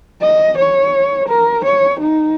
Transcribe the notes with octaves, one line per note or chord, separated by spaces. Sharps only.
D#5
C#5
A#4
C#5
D#4